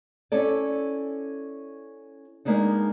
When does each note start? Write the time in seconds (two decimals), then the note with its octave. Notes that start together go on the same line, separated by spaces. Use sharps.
0.32 C#4 E4 A4 D5
2.45 G#3 A#3 B3 D4 D#4